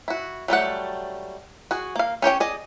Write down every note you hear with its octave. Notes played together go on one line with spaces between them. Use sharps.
E4 F#4
F#3 G3 A3 F#5
F#4 G#4
A#3 F5
C#4 G4 C#5 G5
G#4 D5 D#5